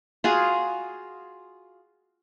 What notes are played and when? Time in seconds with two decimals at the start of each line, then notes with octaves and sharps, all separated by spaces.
0.24 F4 F#4 G#4